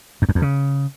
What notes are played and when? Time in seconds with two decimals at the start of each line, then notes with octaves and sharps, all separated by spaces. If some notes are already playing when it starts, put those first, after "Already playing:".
0.22 F#2
0.29 F2
0.35 E2
0.42 C#3